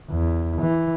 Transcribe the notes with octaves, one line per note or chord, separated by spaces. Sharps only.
E2
E3